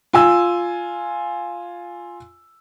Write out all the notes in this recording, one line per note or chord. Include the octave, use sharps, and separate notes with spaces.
F4 G#5 E6